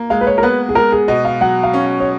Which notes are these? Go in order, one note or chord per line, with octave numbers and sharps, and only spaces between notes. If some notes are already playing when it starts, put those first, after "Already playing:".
Already playing: A#3
G#3 F5
B4
C#5
A#4
B3 B4
G#4
G#3 A#4
G#4
B2 D#5
F5
F#3 F#5
F5
C#4
C#5